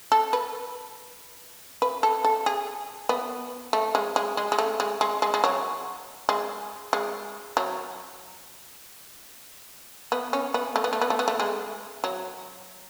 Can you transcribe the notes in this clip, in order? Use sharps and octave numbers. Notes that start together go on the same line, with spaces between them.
A4
B4
B4
A4
A4
G#4
B3
A3
G#3
G#3
G#3
G#3
A3
G#3
G#3
G#3
G#3
F#3
G#3
G#3
F#3
B3
C#4
B3
A3
B3
A3
B3
A3
B3
A3
G#3
F#3